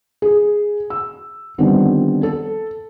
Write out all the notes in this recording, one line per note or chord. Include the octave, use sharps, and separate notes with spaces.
G#4
E6
D3 D#3 F3 G3 B3 C4
A4